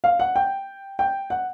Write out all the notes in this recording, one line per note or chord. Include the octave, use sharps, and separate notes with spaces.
F5
F#5
G5
G5
F#5